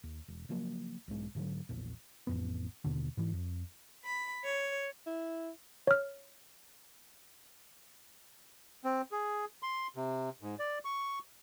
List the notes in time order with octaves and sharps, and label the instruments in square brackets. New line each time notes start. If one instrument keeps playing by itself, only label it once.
[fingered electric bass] D#2
E1
C#3 F3 F#3 A#3
B1 G#2 G#3
G#2 D3 D#3 F#3
A#1 E2 A#2
[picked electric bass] A1 F2 B3
D#2 B2 D3
G#2 E3
F2
[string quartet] B5
C#5
[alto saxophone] E4
[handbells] C#5 F6
[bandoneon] C4
G#4
C6
C3
G#2
D5
C#6